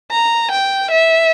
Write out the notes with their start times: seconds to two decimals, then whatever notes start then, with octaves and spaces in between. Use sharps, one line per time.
0.12 A#5
0.51 G5
0.91 E5